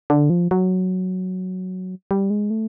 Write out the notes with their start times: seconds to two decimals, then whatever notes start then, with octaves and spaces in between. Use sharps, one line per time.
0.10 D3
0.30 F3
0.51 F#3
2.11 G3
2.30 G#3
2.50 A3